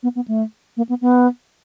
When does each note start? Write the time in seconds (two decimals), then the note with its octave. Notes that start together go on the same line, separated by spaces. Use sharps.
0.03 B3
0.16 B3
0.28 A3
0.77 A#3
0.89 B3
1.01 B3